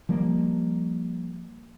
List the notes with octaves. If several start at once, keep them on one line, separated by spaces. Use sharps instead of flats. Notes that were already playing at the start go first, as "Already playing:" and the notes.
F3 G3 A#3